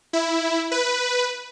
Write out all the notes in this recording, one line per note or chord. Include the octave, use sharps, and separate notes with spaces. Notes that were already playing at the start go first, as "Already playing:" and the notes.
E4
B4